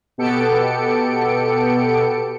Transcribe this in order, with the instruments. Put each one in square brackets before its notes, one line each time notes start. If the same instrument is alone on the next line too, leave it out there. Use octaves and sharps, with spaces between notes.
[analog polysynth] B2 B3 G4 A4 C#7 D7